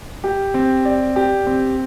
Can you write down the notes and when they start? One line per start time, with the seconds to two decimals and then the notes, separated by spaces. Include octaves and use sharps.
0.24 G4
0.54 C4
0.85 D5
1.16 G4
1.46 C4